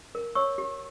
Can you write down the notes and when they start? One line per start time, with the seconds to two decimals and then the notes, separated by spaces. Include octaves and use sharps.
0.15 A#4
0.35 C#5 C#6 E6
0.58 G4